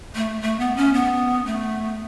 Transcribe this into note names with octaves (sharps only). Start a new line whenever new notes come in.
A3
A3
B3
C#4
B3
A3